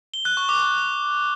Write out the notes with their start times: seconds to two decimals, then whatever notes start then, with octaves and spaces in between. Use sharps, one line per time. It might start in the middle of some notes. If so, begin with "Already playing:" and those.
0.14 G7
0.25 F#6
0.37 C#6
0.49 D6